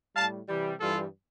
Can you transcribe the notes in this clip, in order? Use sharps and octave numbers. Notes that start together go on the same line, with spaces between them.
A2 G3 F5 A5
C3 E3 G3
G2 E3 G3 F4 A4